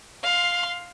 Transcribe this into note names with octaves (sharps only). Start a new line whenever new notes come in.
F5 C6